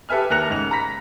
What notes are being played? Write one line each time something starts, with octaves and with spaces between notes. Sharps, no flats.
G4 A4 B4 E5 G#5 F6
D#2 A#4 F#6 A#6 C#7 F7
G#2 C#3 F7
A#5 B5 A#6 B6